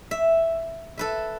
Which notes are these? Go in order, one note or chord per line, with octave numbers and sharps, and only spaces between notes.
E5
A4 B4 E5